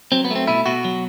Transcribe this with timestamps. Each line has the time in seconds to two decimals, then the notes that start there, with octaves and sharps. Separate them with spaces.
0.12 F#3 C4
0.24 B3
0.31 A3 C4
0.47 B2 E4
0.66 B2 F#4
0.85 F#3